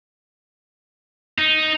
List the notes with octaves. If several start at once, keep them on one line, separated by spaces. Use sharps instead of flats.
D#4